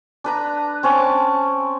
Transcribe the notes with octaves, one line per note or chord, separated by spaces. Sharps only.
D4 B4 A#5
C4 C#4 A5 D6